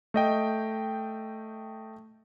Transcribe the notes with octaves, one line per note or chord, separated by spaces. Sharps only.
A3 D#5 G5